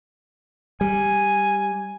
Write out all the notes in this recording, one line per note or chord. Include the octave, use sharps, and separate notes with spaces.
G3 G#5